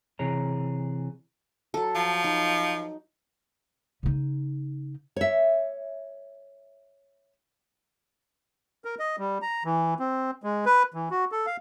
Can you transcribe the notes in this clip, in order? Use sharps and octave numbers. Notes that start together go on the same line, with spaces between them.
C3 E3 G#4 C#5 A#5
F#3 A4
F3
D#4
C#3 D#4
C#5 E5
A#4
D#5
G3
A#5
E3
C4
G#3
B4
E3
F#4
A4
F5